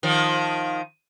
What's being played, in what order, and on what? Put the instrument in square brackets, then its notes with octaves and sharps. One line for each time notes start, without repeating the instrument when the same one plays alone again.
[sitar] D#3 F3